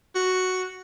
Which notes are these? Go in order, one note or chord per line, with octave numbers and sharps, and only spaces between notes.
F#4